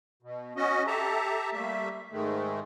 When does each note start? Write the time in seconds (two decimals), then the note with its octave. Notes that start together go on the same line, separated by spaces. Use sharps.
0.23 B2
0.56 C#4 F#4 D#5
0.87 G4 A4 E5 A5 A#5
1.53 G3 A3 A#3 E5
2.11 G#2 D#3 G#3 A3